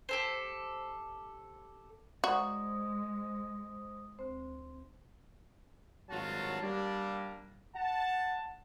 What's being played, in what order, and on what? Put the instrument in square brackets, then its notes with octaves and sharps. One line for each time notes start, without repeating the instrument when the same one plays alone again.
[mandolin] G4 A4 C5
[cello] G#3 [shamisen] F#4 [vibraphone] C5 D#6 [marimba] D5 A#5
[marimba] D2 C5 [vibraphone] C4
[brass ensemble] G#1 G2 F#3 F4 F#4 A5
G3 A#3 D4
F#5 A5